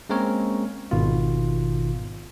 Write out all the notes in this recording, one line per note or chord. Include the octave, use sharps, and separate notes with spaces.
G#3 A#3 C4 C#4 A#4 C#5
G#1 B2 D#3 F4